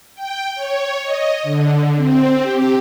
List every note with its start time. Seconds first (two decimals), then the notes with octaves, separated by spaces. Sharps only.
0.15 G5
0.55 C#5
1.03 D#5
1.43 D3
1.96 C4
2.42 G4